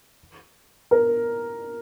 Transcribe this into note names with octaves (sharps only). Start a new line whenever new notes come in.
A#4